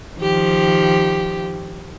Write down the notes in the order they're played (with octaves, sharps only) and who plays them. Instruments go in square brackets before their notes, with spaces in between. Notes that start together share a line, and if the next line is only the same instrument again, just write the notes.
[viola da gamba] D#3 F3 G4